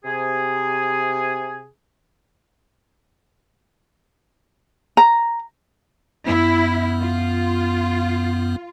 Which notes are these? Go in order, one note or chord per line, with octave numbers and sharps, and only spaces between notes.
C3 G#4
A#5
F#2 B3 E4
F4